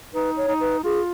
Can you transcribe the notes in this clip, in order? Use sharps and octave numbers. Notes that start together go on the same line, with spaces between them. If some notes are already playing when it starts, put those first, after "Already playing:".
D#4 B4
C#5
D#4
B4
F4 G#4